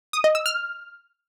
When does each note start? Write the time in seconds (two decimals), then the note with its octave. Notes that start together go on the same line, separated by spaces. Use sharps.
0.13 D#6
0.24 D#5
0.35 E6
0.46 F6